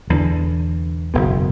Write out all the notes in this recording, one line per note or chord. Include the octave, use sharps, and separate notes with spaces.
E1 E2 D3
F#1 E2 B2